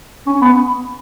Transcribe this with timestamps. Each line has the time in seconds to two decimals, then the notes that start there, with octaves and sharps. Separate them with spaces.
0.27 C#4
0.41 B3